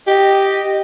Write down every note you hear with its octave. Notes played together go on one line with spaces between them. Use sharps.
G4 D#5